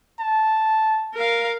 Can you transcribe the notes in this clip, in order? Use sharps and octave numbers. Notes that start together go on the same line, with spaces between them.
A5
A#4 F5